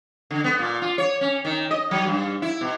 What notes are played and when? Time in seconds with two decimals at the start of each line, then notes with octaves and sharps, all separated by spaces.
0.31 D3
0.44 B3
0.59 A#2
0.82 F4
0.98 C#5
1.21 C#4
1.45 D#3
1.71 D#5
1.91 F#3
2.06 G2
2.42 E4
2.61 B2